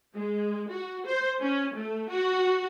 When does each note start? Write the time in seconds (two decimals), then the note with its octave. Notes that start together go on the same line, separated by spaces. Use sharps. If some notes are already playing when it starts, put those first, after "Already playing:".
0.14 G#3
0.70 F#4
1.07 C5
1.40 C#4
1.75 A3
2.09 F#4